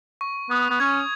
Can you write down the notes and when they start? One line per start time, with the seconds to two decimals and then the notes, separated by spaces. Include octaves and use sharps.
0.21 C#6
0.50 B3 D#6
0.70 B3
0.80 C#4 G#6